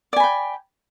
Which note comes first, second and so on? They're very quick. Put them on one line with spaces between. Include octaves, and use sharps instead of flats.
D5 G#5 B5 G5